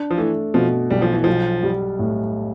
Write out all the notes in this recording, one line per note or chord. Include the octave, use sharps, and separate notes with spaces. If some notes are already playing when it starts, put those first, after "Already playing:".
Already playing: D4
F3
E3 A3
B2 F3
B1 G3
F3
E3
B1 F3
G3
A2